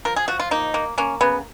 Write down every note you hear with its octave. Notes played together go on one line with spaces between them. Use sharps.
F3 A#4
G#4
F3 F#4
F4
A#3 D#4
A#3
A#3 C#4
C#3 B3